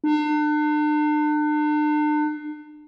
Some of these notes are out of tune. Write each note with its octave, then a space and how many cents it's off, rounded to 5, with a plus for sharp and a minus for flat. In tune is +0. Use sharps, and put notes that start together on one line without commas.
D4 +40